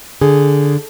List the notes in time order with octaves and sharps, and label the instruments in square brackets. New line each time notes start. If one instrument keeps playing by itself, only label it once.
[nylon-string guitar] D3 [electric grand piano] G#4